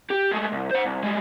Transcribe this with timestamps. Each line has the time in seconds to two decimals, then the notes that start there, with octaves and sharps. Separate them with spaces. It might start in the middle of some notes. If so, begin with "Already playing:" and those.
0.10 G4
0.32 G#3 A3
0.52 C2
0.71 C5 F#5
0.85 C2
1.03 G3 G#3